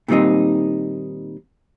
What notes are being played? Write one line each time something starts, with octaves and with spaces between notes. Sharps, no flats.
A#2 D#3 G3 C4 D#4